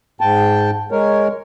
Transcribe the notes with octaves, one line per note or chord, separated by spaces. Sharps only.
G#2 G5 A5
G#3 A#4 C#5